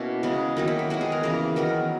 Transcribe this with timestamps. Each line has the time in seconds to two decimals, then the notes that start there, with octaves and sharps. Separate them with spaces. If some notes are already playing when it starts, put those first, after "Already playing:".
Already playing: B2 A#3 C#4 E4
0.23 C#3 G#3 B3
0.57 D#3 F#3 A#3 D#4
0.68 E4
0.79 E4
0.90 D#3 G#3 B3 F#4
1.01 G#4
1.12 A#4
1.23 C#3 E3 A#3 A#4
1.56 D#3 F#3 B3 A#4